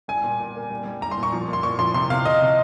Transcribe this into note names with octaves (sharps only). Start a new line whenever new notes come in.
G3 G#5
A#2
A#2
A#3
G3
G3
G3 A#5
C6
A#2
C#6
F3
A#2
C6
A#2 C#6
F3 C6
C3 C6
C3 F5
C3 D#5
C3